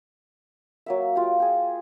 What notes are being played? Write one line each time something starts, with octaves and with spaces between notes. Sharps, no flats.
F#3 A#3 E5
F4 G4
G4 G#4